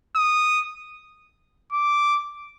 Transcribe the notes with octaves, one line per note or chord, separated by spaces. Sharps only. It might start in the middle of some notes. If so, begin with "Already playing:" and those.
D#6
D6